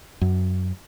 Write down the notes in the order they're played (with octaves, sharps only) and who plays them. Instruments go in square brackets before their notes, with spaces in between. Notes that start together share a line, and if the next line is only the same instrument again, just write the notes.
[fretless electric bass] F#2